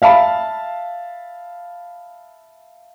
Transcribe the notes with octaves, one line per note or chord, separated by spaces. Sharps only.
E5 F5 A5 B5